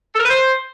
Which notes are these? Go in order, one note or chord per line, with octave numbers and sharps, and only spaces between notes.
A4
A#4
B4
C5